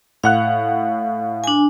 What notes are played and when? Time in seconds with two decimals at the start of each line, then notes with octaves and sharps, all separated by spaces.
0.24 A2 F5 F#5 F#6
1.44 D4 G#5